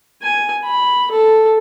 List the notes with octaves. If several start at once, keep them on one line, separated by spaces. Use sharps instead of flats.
G#5
B5
A4